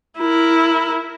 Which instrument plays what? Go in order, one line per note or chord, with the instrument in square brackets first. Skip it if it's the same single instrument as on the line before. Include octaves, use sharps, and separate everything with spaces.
[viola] E4 A#4